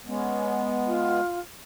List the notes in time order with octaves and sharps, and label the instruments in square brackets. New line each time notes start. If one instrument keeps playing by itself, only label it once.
[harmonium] G#3 B3 [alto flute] C#4
[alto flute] F4